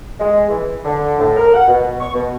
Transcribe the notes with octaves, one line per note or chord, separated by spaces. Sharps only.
G#3
E3
D3
A2
A#4
F#5
B2
C#6
B2